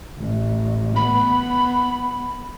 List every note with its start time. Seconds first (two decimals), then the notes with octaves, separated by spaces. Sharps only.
0.17 A1
0.96 B3 B5